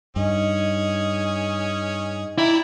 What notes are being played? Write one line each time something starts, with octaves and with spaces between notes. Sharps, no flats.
G2 C#4 D#4 G#4 D#5
E4 D5 G5 A#5